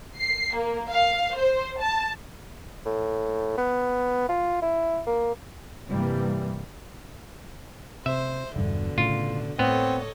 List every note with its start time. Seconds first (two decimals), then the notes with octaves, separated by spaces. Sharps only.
0.18 C7
0.54 A#3
0.89 F5
1.35 C5
1.80 A5
2.86 A2
3.58 B3
4.29 F4
4.62 E4
5.07 A#3
5.89 G2 C3 E3 G3 A#3
8.06 C3 C5 E5
8.56 E1 G2 B2 D3
8.98 A2 C#3 F4
9.59 A2 B3 C4 A4 C#5 D#5